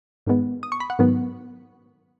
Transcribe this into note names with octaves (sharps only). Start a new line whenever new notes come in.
G#2 D#3 G#3 B3
D#6
C#6
B5
F#5
G#2 D#3 F#3 B3